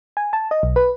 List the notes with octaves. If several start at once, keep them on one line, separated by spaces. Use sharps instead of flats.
G#5
A5
D#5
B1
B4